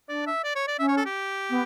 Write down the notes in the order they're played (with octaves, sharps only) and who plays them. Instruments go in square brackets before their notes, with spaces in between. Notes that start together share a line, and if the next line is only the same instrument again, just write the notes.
[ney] D4 [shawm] D5
[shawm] E5
D5
C#5
D5
[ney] C#4 [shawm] E5
[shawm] C#5
A4
G4
[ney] B3